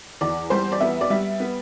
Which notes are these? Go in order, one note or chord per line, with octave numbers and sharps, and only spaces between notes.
E2 D5
G3 C5
D5
B3 E5
D5
G3 E5
B3